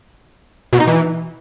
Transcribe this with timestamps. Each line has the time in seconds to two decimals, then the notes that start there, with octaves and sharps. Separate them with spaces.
0.73 B2
0.80 D#4
0.87 E3